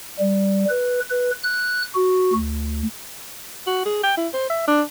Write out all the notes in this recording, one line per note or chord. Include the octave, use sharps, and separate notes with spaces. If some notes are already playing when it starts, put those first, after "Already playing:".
G3
B4
B4
F#6
F#4
D2
F#4
G#4
G5
E4
C5
E5
D4